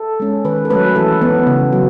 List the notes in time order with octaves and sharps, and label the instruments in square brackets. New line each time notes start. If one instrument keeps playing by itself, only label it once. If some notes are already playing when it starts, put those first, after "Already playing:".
Already playing: [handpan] A4
G#3 C#4
D#3 B4
A4
F#3 A3 C#4 B4
E3 A4
B3
C#3
F#3